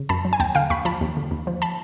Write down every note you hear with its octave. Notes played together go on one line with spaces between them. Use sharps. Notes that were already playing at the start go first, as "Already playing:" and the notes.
Already playing: C#3
F#2 A5 B5
F#3
G#5
D#2 G5 A5
D3 F5 G5
D#2 B5 C#6
F3 A5 B5
D#2
D3
D#2
F3
A5 B5